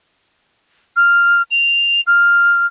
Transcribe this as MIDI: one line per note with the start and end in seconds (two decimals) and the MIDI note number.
0.96 1.42 89
1.51 2.01 101
2.07 2.66 89